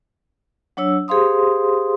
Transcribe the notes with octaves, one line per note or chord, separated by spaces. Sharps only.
F#3 D4 C#5 E6
G4 G#4 C5 F5 C6 D#6